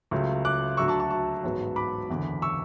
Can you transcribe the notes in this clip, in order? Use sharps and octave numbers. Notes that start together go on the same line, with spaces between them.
C#2 C#3 F#3 A3
D6 F#6
D2 D3 F#3 A3 C#6 E6
A5 C#6
A5 C#6
A5 C#6
A1 G#2 F#3 B3
B5 D6
F#1 E2 D3
C#6 E6